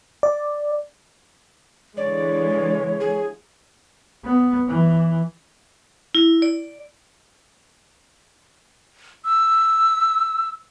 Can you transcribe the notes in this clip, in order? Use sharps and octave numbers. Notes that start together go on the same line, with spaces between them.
D5
D3 E3 G#3 C#5 D5
G#4
B3
E3
E4
D5
E6